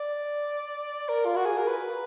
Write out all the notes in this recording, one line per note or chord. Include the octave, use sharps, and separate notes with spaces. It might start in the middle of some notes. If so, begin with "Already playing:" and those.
Already playing: D5
A#4
F4
F#4
G#4
A#4
B4